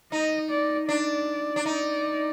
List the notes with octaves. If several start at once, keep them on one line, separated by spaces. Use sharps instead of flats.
D#4 D#5
D5
D4 D5
D4
D#4